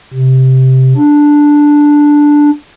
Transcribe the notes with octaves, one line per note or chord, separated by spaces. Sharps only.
C3
D4